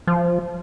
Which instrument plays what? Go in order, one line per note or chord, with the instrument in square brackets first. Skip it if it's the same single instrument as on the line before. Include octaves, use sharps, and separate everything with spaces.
[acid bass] F3